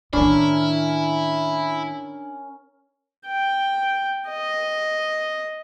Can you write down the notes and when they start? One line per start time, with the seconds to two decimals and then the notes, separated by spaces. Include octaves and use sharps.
0.13 A2 D#3 C#4 D4 E4 A#4
3.27 G5
4.28 D#5